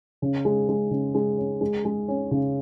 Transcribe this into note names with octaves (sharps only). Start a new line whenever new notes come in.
C#3
G#3
G#3
C#3
G#3
C#4
G#3
G#3
C#4
C#3